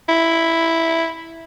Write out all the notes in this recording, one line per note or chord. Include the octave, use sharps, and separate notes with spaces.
E4